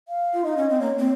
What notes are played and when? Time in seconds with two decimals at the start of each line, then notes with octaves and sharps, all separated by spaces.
0.08 F5
0.34 F4
0.44 D#4 D#5
0.57 C#4
0.69 C4
0.81 A#3 C#5
0.98 C4